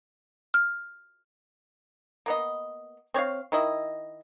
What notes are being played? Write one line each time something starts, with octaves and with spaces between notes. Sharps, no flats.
F6
A#3 B3 D#5
C4 C#5 D5 F5
D#3 E4 D#5